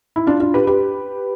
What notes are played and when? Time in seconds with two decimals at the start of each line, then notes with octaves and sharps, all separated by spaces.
0.16 E4
0.27 D4 F4
0.40 D4 F4
0.54 G4 B4
0.67 G4 B4